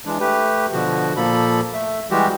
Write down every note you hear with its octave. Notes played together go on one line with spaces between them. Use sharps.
E3 G#3 D4
A3 G4 B4
B2 D3 F3 F#4
A#2 F3 A#3 A4 B5
A3 E5
E3 G3 G#3 F#4 G4